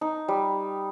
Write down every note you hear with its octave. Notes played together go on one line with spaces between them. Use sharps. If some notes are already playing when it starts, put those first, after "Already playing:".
D#4
G3